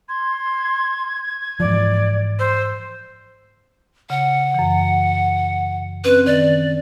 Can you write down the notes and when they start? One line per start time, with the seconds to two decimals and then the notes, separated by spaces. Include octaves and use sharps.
0.09 C6 G#6
1.60 G#2 E3 F3 D5
2.39 C5 E6
4.10 C#3 F#5
4.54 F#2 E3
6.04 C4 C#4 B4
6.26 D#3 D5